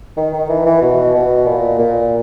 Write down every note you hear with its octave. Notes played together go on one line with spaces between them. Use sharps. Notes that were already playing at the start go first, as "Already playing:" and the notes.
D#3
D#3
E3
E3
B2
B2
A#2
A#2